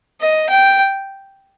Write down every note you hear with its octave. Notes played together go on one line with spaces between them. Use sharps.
D#5
G5